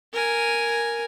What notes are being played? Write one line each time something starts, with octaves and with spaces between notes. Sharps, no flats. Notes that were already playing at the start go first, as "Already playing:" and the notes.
A#4 G#5